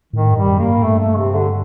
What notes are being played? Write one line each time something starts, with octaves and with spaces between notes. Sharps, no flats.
A2 D#3
G2
G3
F#2
A#3
G2
A2
G2 A3
A3
C3
D3